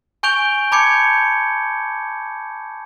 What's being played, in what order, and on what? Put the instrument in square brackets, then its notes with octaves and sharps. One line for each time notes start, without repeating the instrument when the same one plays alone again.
[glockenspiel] G#5 C#6 G6 D7 F7 G7
A5 B5 D6 G6 G#6 C#7